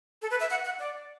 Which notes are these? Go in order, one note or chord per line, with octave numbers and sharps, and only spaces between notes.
A4
B4
E5
F#5
F#5
D5